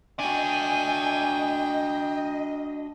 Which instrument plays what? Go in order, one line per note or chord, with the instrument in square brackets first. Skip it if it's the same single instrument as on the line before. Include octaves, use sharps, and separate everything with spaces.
[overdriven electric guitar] D4 F#4 [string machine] D#5 [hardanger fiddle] G5 [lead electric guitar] G#5